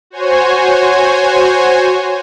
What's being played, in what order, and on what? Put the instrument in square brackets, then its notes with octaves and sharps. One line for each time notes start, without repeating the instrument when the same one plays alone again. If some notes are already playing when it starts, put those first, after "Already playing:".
[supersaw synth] F#4 C5 C#5 G#5